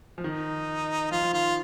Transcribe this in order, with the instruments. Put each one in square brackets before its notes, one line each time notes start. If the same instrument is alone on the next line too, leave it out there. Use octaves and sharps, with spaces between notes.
[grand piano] F3
[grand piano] D#3 [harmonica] D#4
[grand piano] F3 [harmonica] F4
[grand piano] F3
[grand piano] D#3 [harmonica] F4